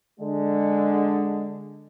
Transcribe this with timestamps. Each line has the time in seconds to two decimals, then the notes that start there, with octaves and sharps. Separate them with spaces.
0.20 D3 G#3